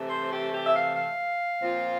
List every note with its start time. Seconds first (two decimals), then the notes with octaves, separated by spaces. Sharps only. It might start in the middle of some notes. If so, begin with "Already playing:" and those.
Already playing: C3 E3 A3
0.08 C5
0.31 G4
0.53 G4
0.64 E5
0.74 F5
0.95 F5
1.61 A#2 F3 C4 F4